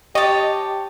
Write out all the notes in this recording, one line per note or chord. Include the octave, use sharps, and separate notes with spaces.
G4 C#5 D#5 A5